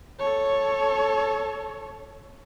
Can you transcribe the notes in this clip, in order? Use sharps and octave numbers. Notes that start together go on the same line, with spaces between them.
A4 C#5